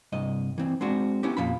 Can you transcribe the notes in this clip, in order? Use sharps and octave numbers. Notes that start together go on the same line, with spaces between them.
C2 G2 D#5
E3 C4
G#3 C4 D4 F#4
B3 C#4 E4 G4
F2 A#2 F3 B5